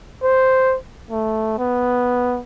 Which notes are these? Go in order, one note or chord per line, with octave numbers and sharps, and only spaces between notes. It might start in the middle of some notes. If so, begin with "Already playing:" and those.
C5
A3
B3